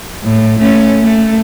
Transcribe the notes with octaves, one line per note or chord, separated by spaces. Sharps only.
A2
A3 C#4
A3